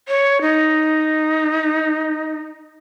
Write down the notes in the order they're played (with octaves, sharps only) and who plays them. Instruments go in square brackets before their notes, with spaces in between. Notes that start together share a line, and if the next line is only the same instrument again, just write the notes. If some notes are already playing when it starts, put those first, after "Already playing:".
[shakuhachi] C#5
D#4